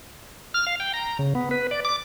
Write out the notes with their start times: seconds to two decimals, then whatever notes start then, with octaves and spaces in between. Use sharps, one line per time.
0.54 F6
0.67 F5
0.80 G5
0.94 A#5
1.19 C#3
1.35 B3
1.51 B4
1.71 D5
1.85 D6